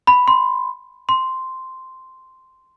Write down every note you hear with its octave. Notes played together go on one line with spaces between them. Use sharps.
B5
C6
C6